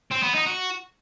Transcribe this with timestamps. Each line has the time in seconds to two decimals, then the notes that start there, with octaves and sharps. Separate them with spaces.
0.11 C4
0.23 B3
0.34 D#4
0.46 F#4